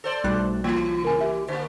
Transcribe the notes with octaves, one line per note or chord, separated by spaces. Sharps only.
A4 C5 D5
B1 G3 A3 F#6
E3 A#3 F4
C#3 A#4 G#5
G4 E5
D3 A#3 C5